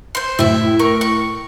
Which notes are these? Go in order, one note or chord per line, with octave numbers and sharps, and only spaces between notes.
C5 C6
A2 E4 E5
A#4 C#6
C#6